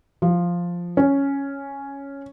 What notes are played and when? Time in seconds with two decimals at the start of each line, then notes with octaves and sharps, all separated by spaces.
0.22 F3
0.97 C#4